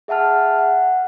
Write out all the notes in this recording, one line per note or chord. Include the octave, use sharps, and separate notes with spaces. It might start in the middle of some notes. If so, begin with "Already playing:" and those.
G#4 E5 F#5 A5 F6
F#5